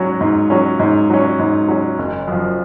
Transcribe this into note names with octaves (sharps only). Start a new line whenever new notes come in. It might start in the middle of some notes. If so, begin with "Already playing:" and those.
Already playing: G#2 F#3 C#4
G#2
F#3 C#4
G#2
F#3 C#4
G#2
F#3 C#4
F#1
F#2 F3